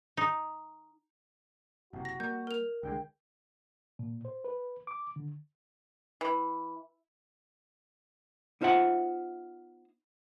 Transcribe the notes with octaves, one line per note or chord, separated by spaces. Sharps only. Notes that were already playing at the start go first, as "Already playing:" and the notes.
D#4
F#1 C3 F#4
A#6
G3 A#3 G6
A#4 F7
C2 D3 G#3 G5
A#2
C5
B4
D6
D3
E3
B3 D#4 F4 C5 E5 F#5